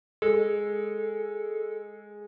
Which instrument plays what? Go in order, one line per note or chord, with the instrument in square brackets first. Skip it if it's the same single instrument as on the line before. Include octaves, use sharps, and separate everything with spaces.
[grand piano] G#3 [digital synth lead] A4